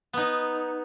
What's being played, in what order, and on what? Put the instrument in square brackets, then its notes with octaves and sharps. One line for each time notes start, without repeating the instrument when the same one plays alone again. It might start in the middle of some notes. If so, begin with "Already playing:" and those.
[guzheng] B3 D#4